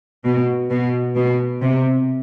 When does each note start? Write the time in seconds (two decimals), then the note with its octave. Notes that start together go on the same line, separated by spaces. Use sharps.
0.25 B2
0.70 B2
1.16 B2
1.61 C3